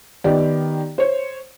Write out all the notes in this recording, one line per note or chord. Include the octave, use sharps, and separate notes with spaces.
D#3 B3 G4 D5
C5 C#5